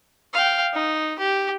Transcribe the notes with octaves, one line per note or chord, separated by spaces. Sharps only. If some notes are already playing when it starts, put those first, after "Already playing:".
F5 G5
D#4
G4